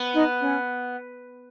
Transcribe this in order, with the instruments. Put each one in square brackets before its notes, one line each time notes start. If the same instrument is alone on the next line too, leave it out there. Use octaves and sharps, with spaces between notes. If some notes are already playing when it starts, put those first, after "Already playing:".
Already playing: [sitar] B3
[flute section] D#4
C#4